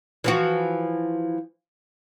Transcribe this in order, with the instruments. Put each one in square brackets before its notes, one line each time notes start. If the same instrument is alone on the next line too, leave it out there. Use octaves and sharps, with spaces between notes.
[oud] E3 F3 F#4